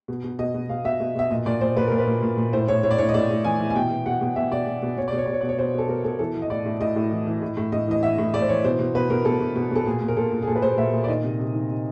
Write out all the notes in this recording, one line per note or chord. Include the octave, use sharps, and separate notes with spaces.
B2
B2
B2 D#5
B2
B2 F5
B2 E5
B2
B2 E5
A#2 D#5
A#2 D5
A#2 C5
A#2 B4
A#2 A#4
B4
A#2
A#2
A#2
A2 C5
A2 C#5
A2 C#5
D5
A2 C#5
D#5
A2 D5
A2
E3 G#5
E3
G#5
B2 G5
B2
B2 F#5
B2
B2 E5
B2 D5
B2
B2
B2 C#5
D5
B2
C#5
B2 D5
C#5
B2 D5
C#5
B2 C5
B2 A4
B2 A#4
B2 A4
E3 A4
E3
D#5
A2 D5
A2
A2 D#5
A2
E3
E3
A2
A2
A2 D#5
E3 D#5
E3 E5
A2
A2 D5
C5
E3 C#5
B2 C5
B2
B2 B4
B2 A#4
B2 A4
B2
B2
B2 A4
A#2 G#4
A#2
A#4
A#2 A4
A#2
G#4
A#2 A4
B4
A#2 C5
A#2 E5
A#2
D5
D#3 D#5
C3
C3
D#3
C3